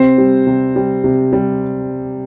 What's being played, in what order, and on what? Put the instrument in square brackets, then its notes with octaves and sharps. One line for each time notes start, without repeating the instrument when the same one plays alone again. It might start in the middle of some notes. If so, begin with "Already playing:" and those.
Already playing: [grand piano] C3 C4 C5
G3
C3
G3
C3
G3